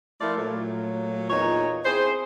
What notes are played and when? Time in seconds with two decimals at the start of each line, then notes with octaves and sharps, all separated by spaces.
0.21 F3 A3 E4 F4 A#4 D5
0.38 A#2 F#3 A3
1.30 E2 A#2 D#4 C#5
1.85 C4 E4 G#4 C5